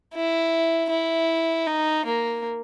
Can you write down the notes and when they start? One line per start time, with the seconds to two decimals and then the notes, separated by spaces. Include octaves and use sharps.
0.14 E4
0.90 E4
1.67 D#4
2.06 A#3